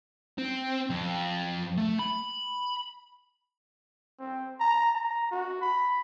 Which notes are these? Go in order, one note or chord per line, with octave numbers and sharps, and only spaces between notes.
C4
F2
A3
B5
C4
A#5
A#5
F#4
B5